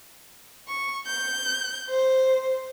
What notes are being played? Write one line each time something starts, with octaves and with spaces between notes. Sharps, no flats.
C#6
G6
C5